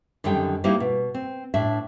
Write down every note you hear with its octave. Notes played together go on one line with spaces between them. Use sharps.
F#2 D3 D#3 G3 G5
G3 A#3 C4 D#4 E4
B2
C4
A2 D4 E5